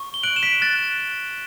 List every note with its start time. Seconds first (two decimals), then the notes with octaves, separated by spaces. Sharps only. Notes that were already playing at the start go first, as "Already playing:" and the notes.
Already playing: C#6
0.14 G7
0.23 F#6 D7 F#7
0.36 E7
0.43 B6 D7
0.62 F#6 A6